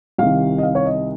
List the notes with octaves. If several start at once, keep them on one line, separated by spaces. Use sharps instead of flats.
C2 C3 D#3 F5
D#5
F5
C#5
D#5